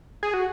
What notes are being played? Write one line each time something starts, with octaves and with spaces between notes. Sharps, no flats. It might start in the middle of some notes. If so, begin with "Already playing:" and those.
G#4
F#4